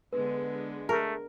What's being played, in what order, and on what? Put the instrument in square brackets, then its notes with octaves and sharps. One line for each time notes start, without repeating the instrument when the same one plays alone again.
[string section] D3 G#3 B3 [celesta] B4
[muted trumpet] A3 [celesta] G#4 [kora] A#4